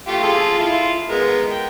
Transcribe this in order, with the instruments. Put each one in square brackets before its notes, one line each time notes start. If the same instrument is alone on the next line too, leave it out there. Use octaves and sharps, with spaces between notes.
[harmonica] A3 F4 G4
F4 G#4 A4
E4 F4
G#3 B3 A#4
G5